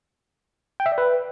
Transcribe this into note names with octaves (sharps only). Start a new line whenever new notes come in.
G5
E5
D5
B4